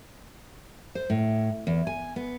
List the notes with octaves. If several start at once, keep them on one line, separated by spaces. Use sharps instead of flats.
C5
A2
E2
G#5
B3